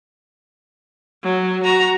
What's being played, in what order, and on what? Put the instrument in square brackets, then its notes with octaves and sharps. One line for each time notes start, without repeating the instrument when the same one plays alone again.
[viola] F#3
F#4 A#5